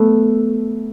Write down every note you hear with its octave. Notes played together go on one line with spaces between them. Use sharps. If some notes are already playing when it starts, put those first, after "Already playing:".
Already playing: A3 B3